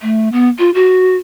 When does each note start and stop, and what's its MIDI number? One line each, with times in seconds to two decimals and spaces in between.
0.02 0.29 57
0.32 0.49 59
0.59 0.73 65
0.74 1.16 66